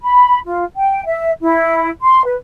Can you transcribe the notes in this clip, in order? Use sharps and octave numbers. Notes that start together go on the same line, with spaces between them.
B5
F4
G5
E5
E4
C6
B4